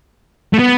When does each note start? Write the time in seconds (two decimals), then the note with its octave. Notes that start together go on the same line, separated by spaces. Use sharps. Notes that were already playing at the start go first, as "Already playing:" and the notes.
0.53 A3
0.59 B3